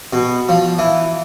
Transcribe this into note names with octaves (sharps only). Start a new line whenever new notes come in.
B2
F3
E3